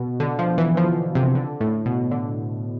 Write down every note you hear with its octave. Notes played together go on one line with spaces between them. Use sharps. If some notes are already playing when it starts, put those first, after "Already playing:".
Already playing: B2
D3
F3
E3
F3
C3
D3
A2
B2
D3